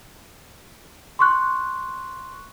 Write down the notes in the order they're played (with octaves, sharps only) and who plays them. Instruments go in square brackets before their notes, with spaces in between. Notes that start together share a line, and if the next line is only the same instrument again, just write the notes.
[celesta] C6 C#6 F#6